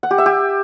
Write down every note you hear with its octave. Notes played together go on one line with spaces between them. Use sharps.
F#5
G4
E5
G4